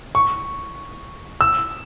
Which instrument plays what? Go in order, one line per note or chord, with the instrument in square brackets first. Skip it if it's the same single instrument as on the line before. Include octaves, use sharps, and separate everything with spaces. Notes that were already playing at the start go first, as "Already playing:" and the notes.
[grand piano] C#6
E6